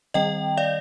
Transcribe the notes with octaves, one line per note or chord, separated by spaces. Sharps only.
D#3 G3 C4 D#5 G5
D5 F5